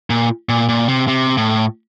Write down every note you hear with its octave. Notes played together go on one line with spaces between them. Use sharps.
A#2
A#2
A#2
C3
C3
A2